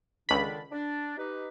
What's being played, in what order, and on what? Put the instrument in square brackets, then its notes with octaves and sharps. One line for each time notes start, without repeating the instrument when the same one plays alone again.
[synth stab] C#2 B5 [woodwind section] D3 D#3 D4
[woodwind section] D4
D#4 G4 B4